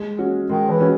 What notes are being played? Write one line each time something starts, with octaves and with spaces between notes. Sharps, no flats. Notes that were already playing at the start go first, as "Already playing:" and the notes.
Already playing: G#3
C#4 F#4
D#3 G#3
E3
C#4 F#4